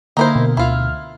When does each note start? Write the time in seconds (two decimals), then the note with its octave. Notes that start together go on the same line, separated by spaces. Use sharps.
0.17 D3 A#3 D#4 E4 A#4 C5
0.35 B2
0.57 D2 E4 F4 F6